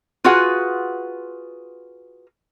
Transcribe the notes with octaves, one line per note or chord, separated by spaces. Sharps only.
F4 F#4 G#4 B4 F#5